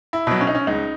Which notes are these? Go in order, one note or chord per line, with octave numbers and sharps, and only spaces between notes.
E4
B2 F#3
C#4
D#4
C#4
C#2 D#4